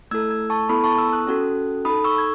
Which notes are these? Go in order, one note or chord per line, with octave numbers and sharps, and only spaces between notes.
A3 E4 A4 E6 G#6
E6 G#6
A5 C#6
B3 E4 A4 B5 D#6
A5 C#6
C#6 E6
D#6 F#6
C#4 F#4 A4
D#4 A4 B5 D#6
C#6 E6
G#6